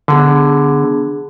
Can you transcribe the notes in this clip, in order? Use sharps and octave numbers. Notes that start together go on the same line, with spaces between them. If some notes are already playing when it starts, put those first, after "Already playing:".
D3 B3 D4 G#4